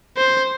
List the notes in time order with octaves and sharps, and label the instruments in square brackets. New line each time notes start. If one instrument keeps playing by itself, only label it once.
[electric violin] C5